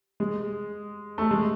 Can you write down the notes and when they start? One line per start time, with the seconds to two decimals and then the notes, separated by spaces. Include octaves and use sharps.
0.20 G#3
1.18 A3
1.31 G#3